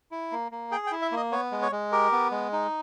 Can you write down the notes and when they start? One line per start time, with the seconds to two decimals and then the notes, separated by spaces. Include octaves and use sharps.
0.11 E4
0.32 A#3
0.52 A#3
0.71 G#4 G5
0.87 G5
0.92 E4
1.02 E5
1.12 A#3 D#5
1.32 B3 C#5
1.52 G#3
1.62 C#5
1.72 G#3
1.92 G4 A#4
2.12 B3
2.31 G#3
2.53 D#4